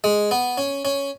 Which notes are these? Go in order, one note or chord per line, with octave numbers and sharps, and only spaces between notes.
G#3
B3
C#4
C#4